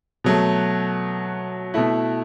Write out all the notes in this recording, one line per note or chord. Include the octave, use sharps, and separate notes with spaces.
B2 F#3 A3
B2 A3 E4